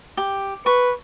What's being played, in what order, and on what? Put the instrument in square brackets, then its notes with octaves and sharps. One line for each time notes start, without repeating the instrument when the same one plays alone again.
[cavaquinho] G4
[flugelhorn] B4 [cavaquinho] C#6